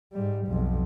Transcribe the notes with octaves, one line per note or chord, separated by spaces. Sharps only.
G#2 G3
B1 F2